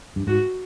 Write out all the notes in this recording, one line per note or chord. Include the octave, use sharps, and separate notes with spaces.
G2
G#2 F#4